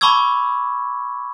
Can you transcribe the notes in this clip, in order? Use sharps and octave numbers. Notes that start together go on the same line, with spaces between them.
A5 B5 C#6 D6 E6 G#6